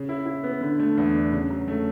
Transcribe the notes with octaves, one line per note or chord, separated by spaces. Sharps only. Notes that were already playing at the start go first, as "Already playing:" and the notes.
Already playing: C#3
E4
E4
B3
D3
A3
E2
D4
C#3
F#3
A3